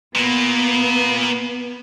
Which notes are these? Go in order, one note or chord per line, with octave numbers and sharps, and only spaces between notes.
A#2 A#3 B3